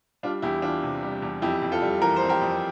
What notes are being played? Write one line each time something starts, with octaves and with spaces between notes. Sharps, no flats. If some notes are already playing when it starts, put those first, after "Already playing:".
G3 D4 F4
E2 E4 G4
E3 D4 F4
C3
G3
E2
F2 E4 G4
F2
F4 A4
G3
E3 A#4
F2 C5
G4 A#4
F2